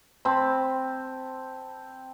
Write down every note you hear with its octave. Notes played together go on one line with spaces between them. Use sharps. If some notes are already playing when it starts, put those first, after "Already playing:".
C4 A5 B5